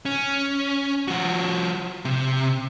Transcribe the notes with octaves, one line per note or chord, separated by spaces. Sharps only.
C#4
F3 F#4
C3